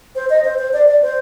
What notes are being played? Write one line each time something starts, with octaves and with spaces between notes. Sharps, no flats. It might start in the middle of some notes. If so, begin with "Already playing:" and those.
C5
D#5
C5
C5
D5
D5
C5